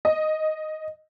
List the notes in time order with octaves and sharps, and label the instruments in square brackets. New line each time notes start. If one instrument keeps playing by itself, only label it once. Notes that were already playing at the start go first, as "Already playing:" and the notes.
[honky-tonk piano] D#5